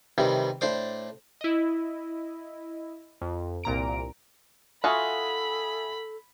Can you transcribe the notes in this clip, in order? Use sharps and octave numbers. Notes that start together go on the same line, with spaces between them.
C3 D#3 E3 G3
A2 D4 C5 D6
E4 D#5
F2
C2 A#2 A#5 D7
F4 F#4 A4 E5 G#5 B5 D#6